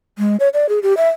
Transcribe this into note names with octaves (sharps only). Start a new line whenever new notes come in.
G#3
C#5
D5
G#4
G4
E5